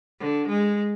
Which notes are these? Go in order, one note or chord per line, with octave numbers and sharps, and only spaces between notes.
D3
G#3